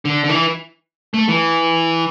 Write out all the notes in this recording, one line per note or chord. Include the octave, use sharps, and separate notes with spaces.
D3
D3
E3
A3
E3